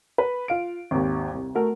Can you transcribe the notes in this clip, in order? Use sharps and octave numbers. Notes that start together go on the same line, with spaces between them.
B4
F4 F5 D7
G#1 D#2
C2
A3 F#4 A#4